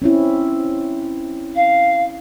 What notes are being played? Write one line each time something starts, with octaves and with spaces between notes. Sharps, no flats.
C4 C#4 E4
F5